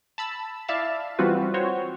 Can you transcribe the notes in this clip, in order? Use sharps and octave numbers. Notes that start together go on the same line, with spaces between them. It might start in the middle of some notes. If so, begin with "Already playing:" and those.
A5 B5 E6
E4 D5 E5 F5 A5
E3 G3 C4 F4 F#4 B4
C4 F#4 C5 C#5